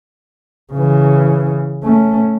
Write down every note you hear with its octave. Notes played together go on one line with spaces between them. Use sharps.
C#3 E3
A3 C#4